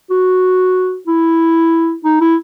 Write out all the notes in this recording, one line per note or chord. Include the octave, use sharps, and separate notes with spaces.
F#4
E4
D#4
E4